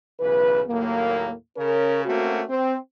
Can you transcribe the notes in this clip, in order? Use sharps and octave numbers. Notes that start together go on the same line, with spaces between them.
B1 C#3 E3 B4
D#2 A2 F#3 A#3
C#3 C#4 A#4
A3 A#3 C4 C#4 F#4
C4